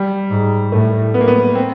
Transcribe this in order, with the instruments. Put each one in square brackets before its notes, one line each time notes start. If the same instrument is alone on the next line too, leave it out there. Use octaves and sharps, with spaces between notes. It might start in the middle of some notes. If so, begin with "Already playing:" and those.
Already playing: [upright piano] G3
[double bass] G#2
[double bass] A2 [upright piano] A3
[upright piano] B3
A#3
B3
C4